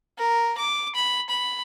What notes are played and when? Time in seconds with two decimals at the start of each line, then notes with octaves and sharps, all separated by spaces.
0.18 A#4
0.58 D6
0.95 B5
1.29 B5